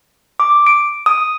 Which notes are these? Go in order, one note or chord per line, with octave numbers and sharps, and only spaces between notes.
D6
D7
D#6